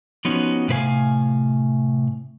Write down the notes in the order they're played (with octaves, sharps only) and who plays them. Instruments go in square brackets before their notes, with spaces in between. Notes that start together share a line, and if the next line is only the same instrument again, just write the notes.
[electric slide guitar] F3 B3 C#4 D#4 F#4
A2 C3 B4 F5 G#5